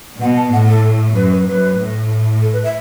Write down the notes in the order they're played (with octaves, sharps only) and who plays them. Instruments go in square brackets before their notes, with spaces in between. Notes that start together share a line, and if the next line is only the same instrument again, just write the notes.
[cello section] B2 [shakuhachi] F#5
[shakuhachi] A5
[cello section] A2 [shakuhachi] F#5
[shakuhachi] A4
[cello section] F#2 [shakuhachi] B4
[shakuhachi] B4
[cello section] F#2 [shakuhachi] B4
[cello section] A2
[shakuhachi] A4
B4
E5